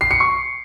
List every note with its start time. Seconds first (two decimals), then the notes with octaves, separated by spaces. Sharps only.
0.01 C7
0.11 C#7
0.20 C#6